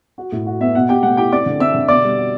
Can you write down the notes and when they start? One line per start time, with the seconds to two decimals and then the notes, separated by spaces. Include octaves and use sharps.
0.18 F#4
0.32 A2
0.46 F#4
0.61 B3 E5
0.75 B2 F#5
0.89 B2 G4 G5
1.03 A3 F#5
1.17 E4 G4 G5
1.32 C4 D5 D6
1.46 D3
1.60 C4 E5 E6
1.74 D3
1.88 B2 D5 D6
2.04 G3
2.17 F#4